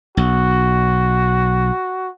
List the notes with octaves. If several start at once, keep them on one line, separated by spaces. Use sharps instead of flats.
B1 F#4